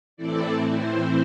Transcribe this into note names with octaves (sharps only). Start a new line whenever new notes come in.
A2 E3 C4 E4 A4 D5
C5